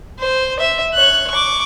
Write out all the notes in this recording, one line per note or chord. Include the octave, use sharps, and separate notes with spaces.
C5
E5
C#5 F#6
C#6 D6